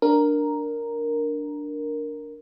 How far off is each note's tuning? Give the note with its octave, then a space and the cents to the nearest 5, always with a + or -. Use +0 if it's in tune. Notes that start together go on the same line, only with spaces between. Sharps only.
D4 +0 A#4 +0